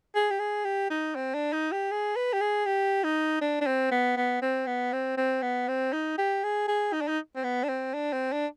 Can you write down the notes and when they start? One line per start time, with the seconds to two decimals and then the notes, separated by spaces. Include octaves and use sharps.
0.15 G#4
0.31 G4
0.39 G#4
0.65 G4
0.90 D#4
1.15 C4
1.34 D4
1.53 D#4
1.72 G4
1.91 G#4
2.16 B4
2.33 G4
2.41 G#4
2.66 G4
3.04 D#4
3.41 D4
3.61 D4
3.66 C4
3.91 B3
4.17 B3
4.42 C4
4.67 B3
4.93 C4
5.17 C4
5.42 B3
5.68 C4
5.93 D#4
6.18 G4
6.44 G#4
6.68 G#4
6.93 D#4
7.01 D4
7.08 D#4
7.36 C4
7.44 B3
7.64 D4
7.69 C4
7.94 D4
8.13 C4
8.32 D4